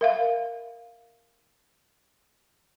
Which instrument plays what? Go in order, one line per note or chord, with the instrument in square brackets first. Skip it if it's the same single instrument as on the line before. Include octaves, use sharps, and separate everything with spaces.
[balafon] A#4 E5 F5